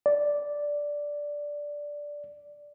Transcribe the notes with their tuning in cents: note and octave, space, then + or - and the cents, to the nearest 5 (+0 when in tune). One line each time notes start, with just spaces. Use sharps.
D5 -5